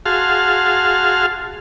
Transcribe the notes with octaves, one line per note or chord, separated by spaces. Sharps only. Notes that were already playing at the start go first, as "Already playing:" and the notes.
F#4 G#4 F5 A5 C6 F6